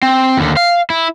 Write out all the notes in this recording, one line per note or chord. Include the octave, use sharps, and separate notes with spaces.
C4
D#2 D3
F5
E4